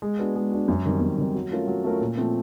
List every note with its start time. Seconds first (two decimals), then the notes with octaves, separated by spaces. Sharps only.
0.02 G#3
0.19 B3 D4 F#4
0.36 G#3
0.52 B3 D4 F#4
0.68 F#2
0.86 D#3 G3 C4
1.01 F#2
1.18 D#3 G3 C4
1.35 F#3
1.51 A3 C#4 F4 A#4
1.67 F#3
1.84 A3 C#4 F4 A#4
2.01 A#2
2.17 F3 A3 C4